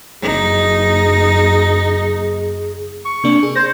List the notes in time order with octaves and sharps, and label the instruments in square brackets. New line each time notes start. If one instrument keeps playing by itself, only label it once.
[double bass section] F#1 [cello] D#4 [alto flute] G#4
[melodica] C#6
[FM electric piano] C3 A#3 D4
G#4
[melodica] C5 [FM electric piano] C6 A6 A#6